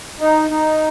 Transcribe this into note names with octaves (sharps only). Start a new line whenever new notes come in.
D#4
D#4